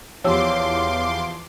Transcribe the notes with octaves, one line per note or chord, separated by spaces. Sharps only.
E2 F3 G4 C#5 F5 C6 D6 E6